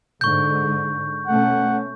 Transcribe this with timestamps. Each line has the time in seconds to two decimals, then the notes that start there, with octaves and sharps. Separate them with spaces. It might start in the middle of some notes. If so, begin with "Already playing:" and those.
0.21 G#2 D3 C#6 G6
1.27 B2 A3 C#4 F#5